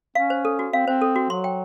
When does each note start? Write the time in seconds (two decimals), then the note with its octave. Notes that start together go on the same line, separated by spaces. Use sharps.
0.15 C#4 F5
0.30 C5
0.45 A4
0.59 F#4
0.73 C4 F5
0.87 C4 C5
1.02 A4
1.16 F#4
1.30 F#3 C6
1.44 G5